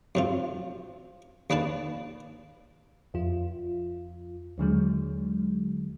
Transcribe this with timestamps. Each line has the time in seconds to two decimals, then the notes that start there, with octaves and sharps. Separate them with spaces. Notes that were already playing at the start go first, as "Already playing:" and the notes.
0.15 F#2 C3 F4
1.50 D#2 A#3 D4 B4 A5
3.14 F2 F4
4.58 D#2 D3 F#3 G#3